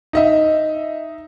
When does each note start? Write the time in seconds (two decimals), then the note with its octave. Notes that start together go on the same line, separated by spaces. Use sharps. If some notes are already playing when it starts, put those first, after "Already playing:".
0.13 D#4 D#5 E5